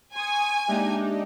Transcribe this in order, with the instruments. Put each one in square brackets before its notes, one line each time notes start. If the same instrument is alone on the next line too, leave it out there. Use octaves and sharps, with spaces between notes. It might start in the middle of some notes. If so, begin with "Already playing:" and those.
[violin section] G#5 [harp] C6 [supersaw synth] C#6 D#6 G#6
[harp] G#3 A#3 E5 [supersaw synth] D4 D#4 G4